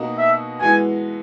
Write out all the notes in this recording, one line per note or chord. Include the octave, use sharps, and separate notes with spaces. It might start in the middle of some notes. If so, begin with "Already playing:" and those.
Already playing: B2 A#3 D#4 F#4
E5
E3 G#3 B3 F#4 G#5